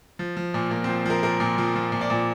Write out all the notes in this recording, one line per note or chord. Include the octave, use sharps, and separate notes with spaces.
F3
F3
A#2
A#2 A#3
C4
F3
F3 A#4
A#2 A#4
A#2
F3
F3
A#2
D5
A#2